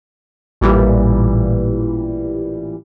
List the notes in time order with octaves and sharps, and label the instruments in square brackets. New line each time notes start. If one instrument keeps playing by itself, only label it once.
[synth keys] A1 A#2 E3 G3